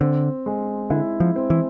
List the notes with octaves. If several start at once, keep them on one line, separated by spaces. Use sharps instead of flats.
D3 C4
G#3
D3 E4
F3
C4
E3